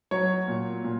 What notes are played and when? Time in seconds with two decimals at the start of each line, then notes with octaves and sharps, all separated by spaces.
0.11 F#3 C#5
0.48 A#2
0.84 A#2